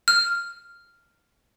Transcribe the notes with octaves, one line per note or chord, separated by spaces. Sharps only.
F6